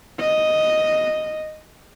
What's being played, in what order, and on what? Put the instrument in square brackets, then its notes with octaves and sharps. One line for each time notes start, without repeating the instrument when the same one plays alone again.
[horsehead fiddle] D#5